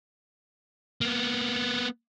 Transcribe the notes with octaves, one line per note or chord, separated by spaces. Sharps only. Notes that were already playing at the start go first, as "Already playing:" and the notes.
A#3 B3